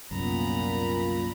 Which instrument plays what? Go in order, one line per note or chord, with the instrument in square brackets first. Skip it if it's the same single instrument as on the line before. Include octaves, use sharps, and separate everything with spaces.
[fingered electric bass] C2 F#2 [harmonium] A#2 [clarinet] B3 [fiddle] A#5 B5